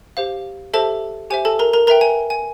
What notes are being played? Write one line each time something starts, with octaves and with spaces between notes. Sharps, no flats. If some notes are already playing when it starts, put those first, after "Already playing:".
G4 C5 F5
G4 A4 C5 E5 A5
G4 C5 E5 G#5
A4 A5
A#4 A#5
A#4 A#5
A#4 B4 E5 G5 A#5
G#5
G#5